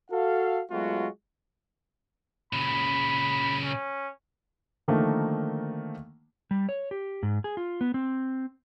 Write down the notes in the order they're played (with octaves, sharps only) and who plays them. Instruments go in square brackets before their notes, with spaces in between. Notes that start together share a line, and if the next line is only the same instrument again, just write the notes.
[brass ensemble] F#4 A4 F5
F#3 G#3 A3 B3 F4 F#4
[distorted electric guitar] A#2 C#3 [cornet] B5
[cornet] C#4
[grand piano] D3 D#3 F3 A3 A#3
[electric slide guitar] G3
C#5
G4
G#2
G#4
F4
B3
C4